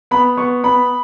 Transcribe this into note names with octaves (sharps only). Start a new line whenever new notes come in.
B3 B5
B3 C#6
B3 B5